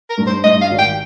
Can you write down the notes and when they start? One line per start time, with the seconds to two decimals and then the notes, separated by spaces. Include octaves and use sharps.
0.10 A#4
0.18 G2
0.27 C5
0.44 G2 D#5
0.61 F5
0.70 G#1
0.79 G5